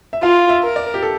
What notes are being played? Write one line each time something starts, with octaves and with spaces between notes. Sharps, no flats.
E5
F4 F5
E5
A#4
D5
G4
A4